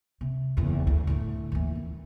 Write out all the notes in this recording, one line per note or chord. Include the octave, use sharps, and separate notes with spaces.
C3
F#1 E2
D2
A2 D3
D#2 E3
C4